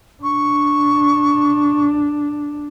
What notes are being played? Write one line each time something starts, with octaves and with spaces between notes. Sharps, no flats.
D4 C#6